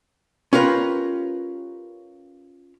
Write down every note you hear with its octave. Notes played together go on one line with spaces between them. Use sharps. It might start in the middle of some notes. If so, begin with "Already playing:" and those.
C#4 F4 G4 A#4 B4